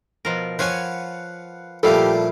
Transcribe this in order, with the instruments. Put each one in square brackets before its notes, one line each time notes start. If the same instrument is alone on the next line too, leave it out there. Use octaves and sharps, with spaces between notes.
[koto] B2 F3 A#4
[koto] F3 C#5 G#5 [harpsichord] B4 F5 F#5
[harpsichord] A#2 F3 A3 [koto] G3 E4 F5 [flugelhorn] G4 [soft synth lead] A4